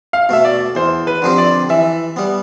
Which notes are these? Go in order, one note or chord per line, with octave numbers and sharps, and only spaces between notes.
F5
B2 A3 E5
D5
E2 C5
B4
D3 F3 C4 G4
D5
E3 E5
G3 B3